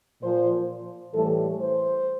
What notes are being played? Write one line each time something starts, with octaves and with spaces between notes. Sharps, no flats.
A#2 F3 C5
A2 E3 G3 A4
C5